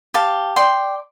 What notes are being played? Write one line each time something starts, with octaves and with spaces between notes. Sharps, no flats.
G4 F5 A5
D5 G5 C6